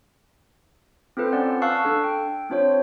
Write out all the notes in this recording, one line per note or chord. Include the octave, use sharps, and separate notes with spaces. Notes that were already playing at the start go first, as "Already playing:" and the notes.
C4 F4 A4 B4 C5
C#4 D5 F#5
F5 A5 C#6 E6 F#6
D4 A4
G5
C4 D4 F4 C5 C#5